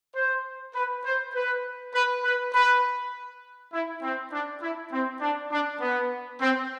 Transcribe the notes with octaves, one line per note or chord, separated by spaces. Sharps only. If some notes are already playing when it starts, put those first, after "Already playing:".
C5
B4
C5
B4
B4
B4
B4
E4
C4
D4
E4
C4
D4
D4
B3
C4